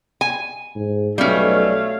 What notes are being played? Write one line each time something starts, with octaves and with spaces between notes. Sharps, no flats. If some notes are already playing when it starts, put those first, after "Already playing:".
G#5
G#2
B1 G3 A3 C#4 C#5 F5